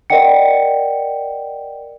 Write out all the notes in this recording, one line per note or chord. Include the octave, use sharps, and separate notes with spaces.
A#4 D5 D#5 F#5 G5 C#7